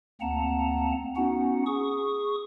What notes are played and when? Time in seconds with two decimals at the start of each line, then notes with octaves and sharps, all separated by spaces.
0.21 D2 A#3 C4 F#5 A5 A#5
1.16 B3 C#4 D#4 F#4 F#5
1.66 G#4 C#6 D#6